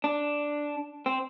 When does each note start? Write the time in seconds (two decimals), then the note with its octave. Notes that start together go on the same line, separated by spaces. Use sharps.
0.04 D4
1.06 C4